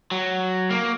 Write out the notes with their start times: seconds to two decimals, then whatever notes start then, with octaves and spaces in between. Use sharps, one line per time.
0.11 F#3
0.70 A#3